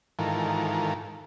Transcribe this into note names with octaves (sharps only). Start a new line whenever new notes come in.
G#2 D#3 E3 F4 A4 A#4